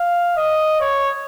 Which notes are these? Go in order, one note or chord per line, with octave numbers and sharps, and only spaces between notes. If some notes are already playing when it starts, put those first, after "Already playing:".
Already playing: F5
D#5
C#5